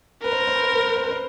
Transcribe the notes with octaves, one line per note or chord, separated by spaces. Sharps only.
A#4 B4
C5
B4
C5
B4
C5
B4
C5
B4
C5
B4
C5